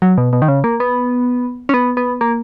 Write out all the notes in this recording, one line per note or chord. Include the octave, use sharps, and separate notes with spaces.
F#3
B2
B2
D#3
C#3
A#3
B3
C#4
B3
B3
A#3